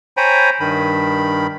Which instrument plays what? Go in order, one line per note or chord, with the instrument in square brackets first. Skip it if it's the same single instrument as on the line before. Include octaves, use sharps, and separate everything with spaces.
[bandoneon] C5 C#5 G5 G#5 A#5 B5
G2 D#3 B5